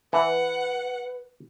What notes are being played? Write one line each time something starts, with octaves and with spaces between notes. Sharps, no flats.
E3 B4 F#5